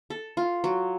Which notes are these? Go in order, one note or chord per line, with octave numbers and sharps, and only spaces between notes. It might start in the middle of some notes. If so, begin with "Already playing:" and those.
A4
F4
F#3